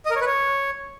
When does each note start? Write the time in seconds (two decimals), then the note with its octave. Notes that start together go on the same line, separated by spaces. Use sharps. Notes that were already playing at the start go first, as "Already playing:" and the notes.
0.06 D#5
0.11 A#4
0.16 C#5
0.21 B4
0.26 C#5